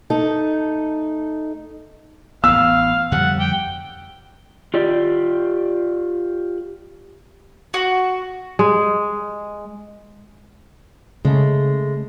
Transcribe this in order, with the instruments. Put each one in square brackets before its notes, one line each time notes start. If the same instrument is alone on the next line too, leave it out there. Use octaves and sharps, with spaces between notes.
[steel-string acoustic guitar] A3 D#4 A4
[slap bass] A1 B3 [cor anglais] F5 [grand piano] E6
[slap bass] F2 D3 G3 [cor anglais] F#5
[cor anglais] G5
[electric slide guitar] F4 G4 D5
[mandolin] F#4
[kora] G#3
[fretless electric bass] C#3 [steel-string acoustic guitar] G#3 A3